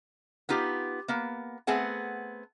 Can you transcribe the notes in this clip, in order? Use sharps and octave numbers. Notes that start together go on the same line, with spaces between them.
B3 D#4 F4 G4
A#3 B3
A3 B3 C4 G#4 F#5